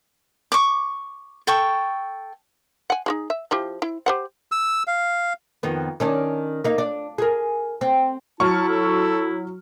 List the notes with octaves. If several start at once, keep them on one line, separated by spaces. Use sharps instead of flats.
C#6 D6
A4 G5 C#6
F#5 G#5
D#4 F#4 G#4
E5
F3 E4 G4
E4
G4 C5 F#5
E6
F5
F2 D#3 B3
D#3 C#4 D4
A#3 D#4
D4
G#4 A#4
C4
F#3 E4 A5 C#6 F6 C#7
A4